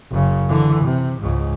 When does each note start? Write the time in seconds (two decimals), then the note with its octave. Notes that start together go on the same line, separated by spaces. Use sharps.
0.11 F#1 C#3
0.49 D3 E3
0.84 C3
1.21 C#2 G#2